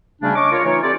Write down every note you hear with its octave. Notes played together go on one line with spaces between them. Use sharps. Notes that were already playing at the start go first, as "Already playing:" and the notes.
D2 C#3 G3 A3 C#4 D4
C#5 D#5 C#6 D6
F4 A#4 C#5
E3 A3 D#4 F4 C#5
C4 F4 G4 A4 D5